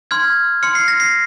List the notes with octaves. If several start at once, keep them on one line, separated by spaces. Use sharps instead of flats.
C6 F6 G#6
C6 F6 C#7
C7
A#6
C7